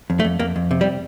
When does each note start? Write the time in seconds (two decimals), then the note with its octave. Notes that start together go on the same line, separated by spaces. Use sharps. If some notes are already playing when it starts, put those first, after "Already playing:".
0.10 F2
0.20 A3
0.24 F2
0.40 F2 A#3
0.56 F2
0.71 C3
0.81 G3